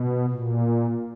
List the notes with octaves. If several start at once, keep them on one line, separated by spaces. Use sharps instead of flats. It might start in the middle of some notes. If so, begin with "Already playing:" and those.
Already playing: B2
A#2